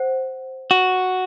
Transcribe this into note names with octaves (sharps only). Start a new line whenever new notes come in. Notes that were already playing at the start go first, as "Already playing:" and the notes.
Already playing: C5 F#5
F#4